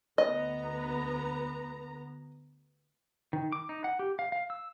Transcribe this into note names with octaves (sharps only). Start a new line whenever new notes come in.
D2 B3 D#5 A#5
D#3
D6
D#4
F#5
G4
F5
F5
E6